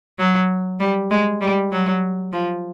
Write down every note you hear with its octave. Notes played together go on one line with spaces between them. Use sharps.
F#3
G3
G#3
G3
F#3
F3